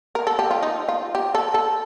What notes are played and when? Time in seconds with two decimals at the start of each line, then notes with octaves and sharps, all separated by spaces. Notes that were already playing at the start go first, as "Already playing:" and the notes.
0.15 A#4
0.27 A4
0.39 G4
0.51 F4
0.63 D#4
0.89 F4
1.15 G4
1.35 A4
1.54 A4